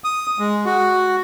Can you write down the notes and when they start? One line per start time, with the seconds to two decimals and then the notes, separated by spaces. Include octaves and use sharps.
0.04 D#6
0.39 G#3
0.65 F#4